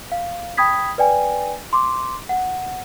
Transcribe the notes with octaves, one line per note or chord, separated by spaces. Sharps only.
F5
G5 B5 D#6 G#6 B6
B4 D5 G5 G#5
C6 D6
F#5